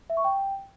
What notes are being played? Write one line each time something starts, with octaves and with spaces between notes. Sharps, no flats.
E5
C#6
G5